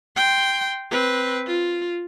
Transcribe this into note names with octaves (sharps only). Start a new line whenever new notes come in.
G5 C6
C4 B4
F4